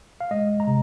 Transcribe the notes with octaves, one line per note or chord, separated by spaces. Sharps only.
F5
G#3 D#5
A#5
C3